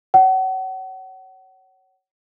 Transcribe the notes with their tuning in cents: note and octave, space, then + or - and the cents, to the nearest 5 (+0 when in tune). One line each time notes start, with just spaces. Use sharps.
C#5 +0 F#5 +35